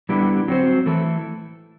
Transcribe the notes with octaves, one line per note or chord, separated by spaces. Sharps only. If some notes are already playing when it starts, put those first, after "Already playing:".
D3 G3 B3 E4 G4
F#3 C4 F#4 C5
E3 A3 E4 A4